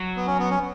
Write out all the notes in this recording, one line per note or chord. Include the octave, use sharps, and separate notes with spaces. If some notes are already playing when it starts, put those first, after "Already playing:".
Already playing: F#3
B3
C#4
B3
C#4